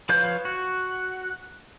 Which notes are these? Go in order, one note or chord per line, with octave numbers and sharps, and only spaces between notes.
F3 B4 C#5 F5 G6
F#4